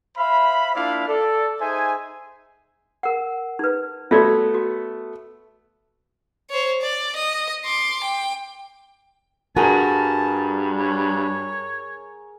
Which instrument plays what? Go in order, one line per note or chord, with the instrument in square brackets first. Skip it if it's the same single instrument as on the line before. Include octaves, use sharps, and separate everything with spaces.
[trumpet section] C5 E5 F5 B5
A#3 D4 E4 F4 D5 F5
A4 D5
D#4 G#4 C5 E5 G#5
[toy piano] A#4 F#5
D#4 B4
[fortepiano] A3 B3 [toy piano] F#4 D5 E5
[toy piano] F#4
[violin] C5 C#5
D5
D#5
C6 D6
G5
[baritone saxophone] G2 [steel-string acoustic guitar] F#4 [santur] G#4 A#4 [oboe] A5
[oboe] C#5